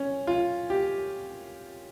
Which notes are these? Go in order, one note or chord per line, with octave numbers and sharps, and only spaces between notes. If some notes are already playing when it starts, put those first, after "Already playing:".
Already playing: C#4
F4
G4